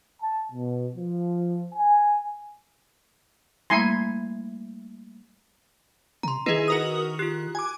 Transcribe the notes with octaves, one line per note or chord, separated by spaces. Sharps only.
A5
B2
F3
G#5
G3 A3 A#3 E4 G#5 C6
C3 A#5 C6
D#3 D#4 E4 G#4 B4 D#5
F#4 A#4 D#6
F4 G4 F#6
G#5 D6